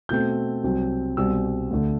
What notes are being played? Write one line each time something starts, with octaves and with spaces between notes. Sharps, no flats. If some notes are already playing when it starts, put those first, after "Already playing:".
B2 A3 C4 G6
C2 C3 F#3 C4
C2 B2 G3 C4 E6
D2 D3 A3